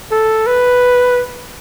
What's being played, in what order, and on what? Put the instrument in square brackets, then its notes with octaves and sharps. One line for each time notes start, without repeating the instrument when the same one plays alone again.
[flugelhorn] A4
B4